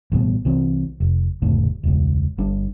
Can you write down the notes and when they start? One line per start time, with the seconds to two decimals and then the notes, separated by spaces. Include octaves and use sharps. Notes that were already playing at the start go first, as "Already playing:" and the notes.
0.12 A1 G2 B2
0.45 C2 E3 C4
1.00 F1
1.42 F1 C#2 A2 D3
1.83 E1 C#2
2.38 G1 G2 D4